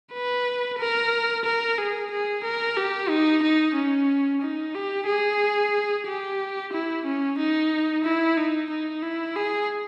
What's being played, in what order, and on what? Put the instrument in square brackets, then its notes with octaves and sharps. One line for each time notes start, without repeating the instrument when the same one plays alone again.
[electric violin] B4
A#4
A#4
G#4
G#4
A#4
G4
D#4
D#4
C#4
D#4
G4
G#4
G4
E4
C#4
D#4
E4
D#4
D#4
E4
G#4